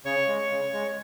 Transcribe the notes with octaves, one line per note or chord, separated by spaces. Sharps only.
C#3 C#5 C#6
G#3
C#3
G#3